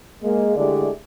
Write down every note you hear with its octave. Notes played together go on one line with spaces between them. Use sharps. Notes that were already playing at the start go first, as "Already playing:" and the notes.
G#3 A#3
D3 G#3 A3 E4 G4 D5